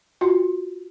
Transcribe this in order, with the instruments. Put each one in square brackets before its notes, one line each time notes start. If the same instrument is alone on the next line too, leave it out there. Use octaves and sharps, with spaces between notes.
[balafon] F4 F#4